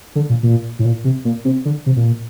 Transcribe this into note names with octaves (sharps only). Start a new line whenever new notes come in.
D3
A#2
A#2
A2
A#2
C3
A#2
C3
D3
C3
A#2